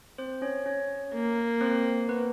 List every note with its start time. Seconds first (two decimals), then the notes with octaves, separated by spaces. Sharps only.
0.18 C4 C5
0.42 C#4 C#5
0.66 C#4 C#5
1.14 A#3
1.61 C4 C5
2.09 B3 B4